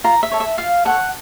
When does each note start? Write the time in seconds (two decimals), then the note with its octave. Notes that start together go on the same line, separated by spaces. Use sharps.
0.04 F4 A#5
0.23 E5
0.31 A4 C#5
0.40 E5
0.58 F4 F5
0.85 A4 C#5 F#5